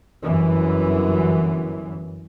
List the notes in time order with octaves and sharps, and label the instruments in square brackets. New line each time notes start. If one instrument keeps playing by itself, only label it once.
[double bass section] G1 F#2 E3